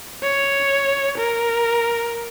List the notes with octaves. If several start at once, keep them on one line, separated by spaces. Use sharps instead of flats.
C#5
A#4